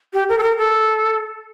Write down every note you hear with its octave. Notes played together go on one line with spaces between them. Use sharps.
G4
A#4
A4
A#4
A4